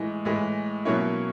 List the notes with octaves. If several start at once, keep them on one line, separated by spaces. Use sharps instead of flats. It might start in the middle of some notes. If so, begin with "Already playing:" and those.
Already playing: A2 E3 G#3
A2 E3 G#3
B2 F#3 A#3 C#4 E4